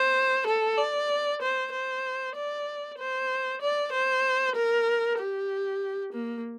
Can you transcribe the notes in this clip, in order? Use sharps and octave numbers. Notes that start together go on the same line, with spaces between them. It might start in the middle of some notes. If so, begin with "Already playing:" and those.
Already playing: C5
A4
D5
C5
C5
D5
C5
D5
C5
A#4
G4
A#3